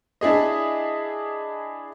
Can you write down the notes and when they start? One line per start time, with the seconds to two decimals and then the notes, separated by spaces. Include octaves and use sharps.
0.21 D4 E4 G#4 D#5